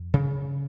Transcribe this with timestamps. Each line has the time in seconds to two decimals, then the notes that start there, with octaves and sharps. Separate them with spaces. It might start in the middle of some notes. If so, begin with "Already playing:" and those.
Already playing: F2
0.14 C#3